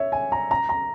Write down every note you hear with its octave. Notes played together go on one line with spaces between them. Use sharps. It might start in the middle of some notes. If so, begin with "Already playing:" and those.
Already playing: C#5 E5
G#5
A#5
A#5
A#5